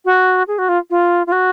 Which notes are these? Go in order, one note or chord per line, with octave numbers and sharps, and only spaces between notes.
F#4
G#4
F#4
F4
F4
F4
F#4